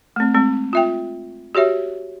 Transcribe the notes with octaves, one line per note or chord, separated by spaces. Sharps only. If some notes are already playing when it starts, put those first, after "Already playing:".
A3 C4
G#3 C4
F4 E5 G5
F#4 G4 C#5 E5